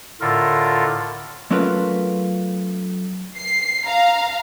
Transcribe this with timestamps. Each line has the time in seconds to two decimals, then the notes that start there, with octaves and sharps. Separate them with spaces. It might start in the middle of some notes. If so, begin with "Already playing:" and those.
0.21 A2 D3 F4 A4 A#4
1.51 F#3 A3 C#4 F4 A#4 B4
3.37 C7
3.87 F5 A#5